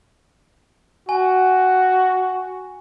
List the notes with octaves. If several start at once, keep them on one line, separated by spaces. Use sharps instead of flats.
F#4 G#5